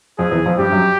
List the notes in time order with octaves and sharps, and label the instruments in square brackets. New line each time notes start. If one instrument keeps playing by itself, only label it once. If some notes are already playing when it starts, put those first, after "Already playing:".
[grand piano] F2 F3 [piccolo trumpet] G#4
[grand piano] E2 E3
F2 F3
[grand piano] G2 G3 [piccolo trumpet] G4
[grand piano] F#2 F#3